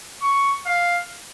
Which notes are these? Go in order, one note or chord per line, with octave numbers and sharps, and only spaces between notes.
C#6
F5